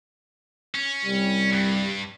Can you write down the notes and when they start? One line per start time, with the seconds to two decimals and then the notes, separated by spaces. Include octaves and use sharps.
0.75 C#4
1.05 C2 G3
1.53 G2